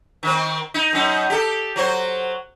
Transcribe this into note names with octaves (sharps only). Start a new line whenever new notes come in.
D#3 C4
D#4
F#2 D#4
G4 A4
F#3 F#4 C5